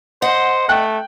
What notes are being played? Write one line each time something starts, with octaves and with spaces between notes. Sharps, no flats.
C5 D#5 F#5
A3 G5 F#6